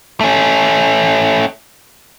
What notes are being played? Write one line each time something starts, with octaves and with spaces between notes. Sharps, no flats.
A3 C#4